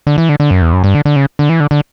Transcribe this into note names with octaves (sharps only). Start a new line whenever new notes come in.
D3
E3
D3
D3
F#2
E2
F#2
G2
D3
D3
C#3
D3
E3
D3
D3